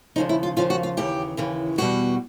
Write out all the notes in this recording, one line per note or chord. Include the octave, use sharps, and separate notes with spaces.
D#2 C#3 F3 D#4
E4
F4
D#2 C#3 F3 F4
F#4
F4
D#2 C#3 E3 G4
D#2 C#3 E3
E2 B2 G3 F#4